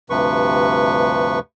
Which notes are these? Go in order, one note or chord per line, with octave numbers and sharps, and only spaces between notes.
D2 G2 C3 F3 B4 C#6